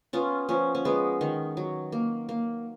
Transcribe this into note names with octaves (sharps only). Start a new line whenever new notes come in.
B3 C#4 F4
F3 C#4
C#4
G#3 B3
D#3
F#3
A#3
A#3